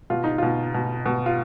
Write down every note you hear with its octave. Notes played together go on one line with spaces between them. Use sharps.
B2 F4
D#4
B2 F4
B2
B2
F4